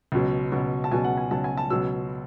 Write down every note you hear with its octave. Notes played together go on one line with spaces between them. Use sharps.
C#2 B2 F#3
C#2 B2 F#3
A5
C#2 B2 F#3 G#5
F#5
G#5
C#2 B2 F#3 A5
G#5
A5
C#2 B2 F#3 E6